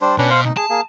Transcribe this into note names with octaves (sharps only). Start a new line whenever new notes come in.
G3 D4 C5
B2 C#4 D4 B4
C5 F5
D#4
G#4 A5
A#3 G#4